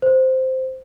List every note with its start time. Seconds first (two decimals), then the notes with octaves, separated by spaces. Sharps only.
0.02 C5